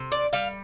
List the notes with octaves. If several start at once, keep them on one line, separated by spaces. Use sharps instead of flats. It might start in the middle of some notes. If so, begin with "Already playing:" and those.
Already playing: C3
D5
G3 F5